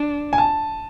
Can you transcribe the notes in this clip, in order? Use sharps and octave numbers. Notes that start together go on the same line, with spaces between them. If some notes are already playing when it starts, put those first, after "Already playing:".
Already playing: D4
G#5
A5